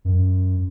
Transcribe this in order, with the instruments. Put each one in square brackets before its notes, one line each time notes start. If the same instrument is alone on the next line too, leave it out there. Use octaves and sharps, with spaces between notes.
[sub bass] F#2